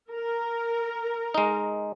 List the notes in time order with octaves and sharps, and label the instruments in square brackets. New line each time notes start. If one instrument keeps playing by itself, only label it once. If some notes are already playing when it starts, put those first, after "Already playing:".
[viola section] A#4
[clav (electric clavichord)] G#3 D#4